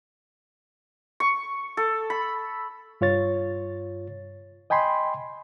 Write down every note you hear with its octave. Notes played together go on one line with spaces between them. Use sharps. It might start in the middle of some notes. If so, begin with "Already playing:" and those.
C#6
A4
B5
G2 F4 C#5 A6
D#5 G5 G#5 B5 C6